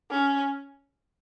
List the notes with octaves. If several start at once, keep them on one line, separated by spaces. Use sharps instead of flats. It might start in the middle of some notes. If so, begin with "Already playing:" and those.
C#4